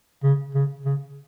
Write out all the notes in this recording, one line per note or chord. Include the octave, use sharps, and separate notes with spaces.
C#3
C#3
C#3